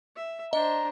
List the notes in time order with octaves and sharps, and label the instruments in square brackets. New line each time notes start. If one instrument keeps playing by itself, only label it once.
[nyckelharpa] E5
[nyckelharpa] D4 C5 [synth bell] D#5 [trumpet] A#5